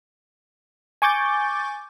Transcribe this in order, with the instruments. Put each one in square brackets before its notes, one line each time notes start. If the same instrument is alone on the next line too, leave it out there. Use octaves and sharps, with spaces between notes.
[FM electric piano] G#5 C#6 D6 G6 A6